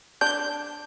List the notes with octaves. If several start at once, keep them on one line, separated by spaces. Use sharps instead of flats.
D4 G6